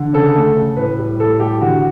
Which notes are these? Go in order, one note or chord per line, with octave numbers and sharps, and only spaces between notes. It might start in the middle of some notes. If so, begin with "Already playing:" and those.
Already playing: D3
C#3 A4
A3
C#3
A2 B4
G3
A2 A4
G3 G4
D3 F#4